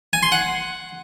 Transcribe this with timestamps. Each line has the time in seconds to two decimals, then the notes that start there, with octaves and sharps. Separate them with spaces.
0.13 G#5
0.23 C6
0.32 F#5